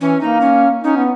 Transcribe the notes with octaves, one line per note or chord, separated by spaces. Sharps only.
E3 C#4
A#3 D#4
C#4
C#4 D#4
B3